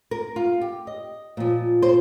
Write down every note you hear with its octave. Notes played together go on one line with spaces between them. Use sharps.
A#4
F4
G4
D#5
A#2 F3
C5